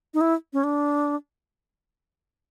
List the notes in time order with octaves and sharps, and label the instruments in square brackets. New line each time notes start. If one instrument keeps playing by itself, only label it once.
[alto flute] D#4
E4
C#4
D4